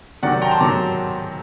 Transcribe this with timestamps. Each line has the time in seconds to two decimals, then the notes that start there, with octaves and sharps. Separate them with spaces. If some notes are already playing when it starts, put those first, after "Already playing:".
0.23 C3 D#3 F#3 D5 F#5
0.41 G5 A#5
0.51 A5 C6
0.60 C3 D#3 F#3 A#5 D6